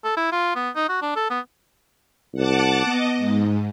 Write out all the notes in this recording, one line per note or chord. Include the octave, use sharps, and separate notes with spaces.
A4
E4
F4
B3
D#4
F#4
D4
A4
B3
C2 F#5 A5 D6
B3 D#5
G#2